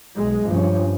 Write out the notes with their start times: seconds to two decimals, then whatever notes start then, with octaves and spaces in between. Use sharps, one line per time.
0.16 B1 G#3
0.48 G2 F3 C#4